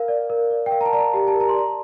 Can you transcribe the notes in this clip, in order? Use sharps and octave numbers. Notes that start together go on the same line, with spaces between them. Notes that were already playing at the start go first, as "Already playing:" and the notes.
Already playing: A#4 F5
D5
A#4
D5
G5
A#4 F5
A#5
A5
D5 A#5
A5
G4 A#5
A5
A#4
A#5
C6
D5 A#5